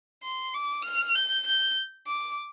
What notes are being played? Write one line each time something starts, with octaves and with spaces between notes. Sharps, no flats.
C6
D6
F6
G6
G6
D6